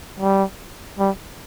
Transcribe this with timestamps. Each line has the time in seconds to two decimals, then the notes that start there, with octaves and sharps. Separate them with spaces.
0.20 G3
0.99 G3